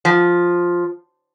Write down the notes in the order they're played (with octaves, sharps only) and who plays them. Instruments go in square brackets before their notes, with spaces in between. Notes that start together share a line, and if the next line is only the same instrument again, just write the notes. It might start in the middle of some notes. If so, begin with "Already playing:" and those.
[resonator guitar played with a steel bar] F3